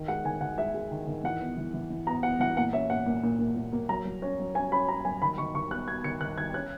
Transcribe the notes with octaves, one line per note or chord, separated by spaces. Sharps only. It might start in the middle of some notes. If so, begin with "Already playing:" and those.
Already playing: D#3
G#3 F#5
D#3 G#5
D#3 F#5
G#3 E5
G#3
D#3
D#3
E3 F#5
B3
E3
E3
E3
B3 A#5
B3 F#5
E3 F#5
A#2 F#5
C#4 E5
A#2 F#5
A#2
A#2
A#2
A#2
A#3
F#3 A#5
F#3
C#4
F#3
C#4 G#5
C#4 B5
C#4 A#5
F#3 G#5
D#3 B5
D#3 C#6
D#3 C#6
B3 F#6
B3 G#6
D#3 C#7
D#3 F#6
D#3 G#6
C#4 F#6